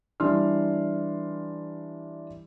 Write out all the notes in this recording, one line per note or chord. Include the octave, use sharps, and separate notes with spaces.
E3 G3 D4 C6 F6